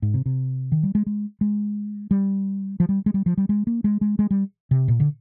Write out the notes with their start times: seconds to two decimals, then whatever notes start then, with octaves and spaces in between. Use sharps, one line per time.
0.02 G#2
0.14 C3
0.26 C3
0.72 D#3
0.83 G3
0.95 G#3
1.06 G#3
1.41 G#3
2.11 G3
2.80 F3
2.89 G3
3.06 G#3
3.14 G3
3.26 F3
3.37 G3
3.49 G#3
3.67 A#3
3.84 G#3
4.01 G#3
4.19 G#3
4.31 G3
4.71 C3
4.88 A#2
5.00 D3